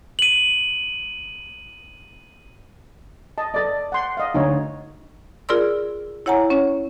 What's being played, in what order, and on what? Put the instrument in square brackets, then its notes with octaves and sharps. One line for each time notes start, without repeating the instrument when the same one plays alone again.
[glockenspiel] D#7 F#7
[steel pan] D#5 A5
[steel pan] A4 D#5 [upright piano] D5 A6
[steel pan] F#5 C6
D#5 F5
[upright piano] D2 [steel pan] D#4 C#5
[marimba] F4 G#4 A#4 D5 C6 E6
E4 C#5 F#5 G#5 A#5
C#4 C#5